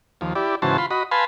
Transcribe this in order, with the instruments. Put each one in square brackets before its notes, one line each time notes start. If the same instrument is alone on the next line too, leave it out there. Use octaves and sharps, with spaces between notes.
[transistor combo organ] D#2 F3
E4 G4 D5
G#2 C#3 E3 F#4 C5 A5
F4 B5 C6
F#4 D#5 B5
B4 F5 G#5 A5 B5 C6